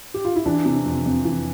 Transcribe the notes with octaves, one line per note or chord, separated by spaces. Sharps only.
G4
F4
E4
E3 D4
C3
F2
F2
E3